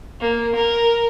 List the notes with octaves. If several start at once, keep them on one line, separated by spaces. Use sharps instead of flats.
A#3
A#4